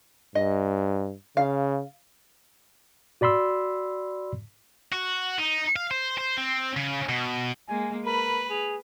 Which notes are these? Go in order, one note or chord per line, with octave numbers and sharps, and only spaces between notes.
G2 D#5
C#3 F5
F#4 D5 B5 C6 E6
F#4
D#4
F5
C5
C5
C4
C#3
B2
G#3 A#3 G#5
A#4 B4 B5
G#4 F7